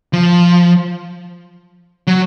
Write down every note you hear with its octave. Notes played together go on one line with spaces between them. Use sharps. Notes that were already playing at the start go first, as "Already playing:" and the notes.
F3
F#3